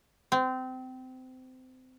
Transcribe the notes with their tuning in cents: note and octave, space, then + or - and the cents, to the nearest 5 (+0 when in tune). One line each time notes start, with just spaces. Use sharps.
C4 -25